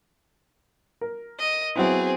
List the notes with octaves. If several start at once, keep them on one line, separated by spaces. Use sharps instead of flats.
A#4
D#5
F#3 B3 C4 E4 G#4